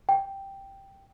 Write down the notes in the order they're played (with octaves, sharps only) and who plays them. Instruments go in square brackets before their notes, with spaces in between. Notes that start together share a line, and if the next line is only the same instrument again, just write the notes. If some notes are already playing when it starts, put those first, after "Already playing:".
[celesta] G5